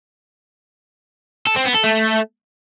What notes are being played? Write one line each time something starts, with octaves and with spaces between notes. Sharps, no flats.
A4
C4
B3
A4
A3